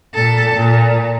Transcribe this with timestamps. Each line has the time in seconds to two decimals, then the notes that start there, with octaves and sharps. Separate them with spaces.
0.14 A#2 A4
0.55 A#2